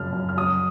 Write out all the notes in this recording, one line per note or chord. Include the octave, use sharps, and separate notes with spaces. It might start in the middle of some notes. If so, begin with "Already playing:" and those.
Already playing: F#2 C#3 F3 F6
F#2
F6
F#3 D#6